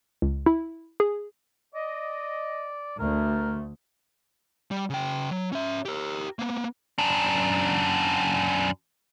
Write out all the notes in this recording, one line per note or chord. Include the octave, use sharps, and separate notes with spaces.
C#2
E4
G#4
D5 D#5
D2 A3 A#4
G3
C#3 G5
F#3
C#4 E5
G4 A#4
A#3 B3
F#2 D4